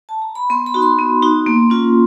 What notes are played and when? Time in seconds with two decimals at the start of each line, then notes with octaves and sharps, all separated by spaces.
0.09 A5
0.22 A#5
0.35 B5
0.50 B3 C6
0.66 B5
0.74 D#4 F#4
0.82 C6
0.99 B3
1.22 D#4 F#4
1.46 A#3
1.70 C#4 F4